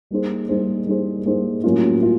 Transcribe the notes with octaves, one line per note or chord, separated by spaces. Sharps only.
G3 A#3 D#4 G#4 C5
G3 A#3 D#4 G#4 C5
G3 A#3 D#4 G#4 C5
G3 A#3 D#4 G#4 C5
A2 F#3 A#3 C#4 F4
C#4 F4